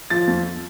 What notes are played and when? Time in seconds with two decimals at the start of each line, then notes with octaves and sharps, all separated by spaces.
0.10 F3 A6
0.27 F2